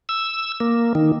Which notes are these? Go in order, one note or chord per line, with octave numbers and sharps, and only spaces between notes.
E6
A#3
D#3